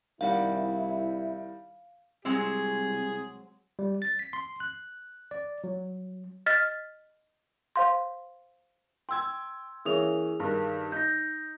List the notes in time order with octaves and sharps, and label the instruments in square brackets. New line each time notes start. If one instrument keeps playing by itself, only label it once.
[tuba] C2 [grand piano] D#3 G3 F#5 [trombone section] E4 [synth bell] F5
[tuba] C2 [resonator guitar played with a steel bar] F#3 G#3 C4 [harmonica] G#4
[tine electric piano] G3
A6
B6
C6
F#6
D5
F#3
[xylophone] D#5 F6 A6 B6
C5 F5 C6
[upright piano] G5 G#6 [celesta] C6 E6
[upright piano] E3 A#3 C#4 [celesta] G#4 D#6 F7
[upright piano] G2 D#3
[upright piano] D#4 [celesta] G6 A#6